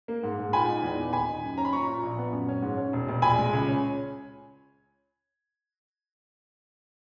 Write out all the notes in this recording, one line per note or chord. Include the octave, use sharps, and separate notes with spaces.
A#3
G#2
G#2
A#2 G#5 B5
D#4
E2
B3
D#2 G#5 B5
D#4
F#2
C#4 A#5
B5
A#2 A#5 C#6
A#2
A#1
B3
F#2
C#4
G#2
C#4
E1
E1
A#1 G#5 B5
G#3
C#2
C#4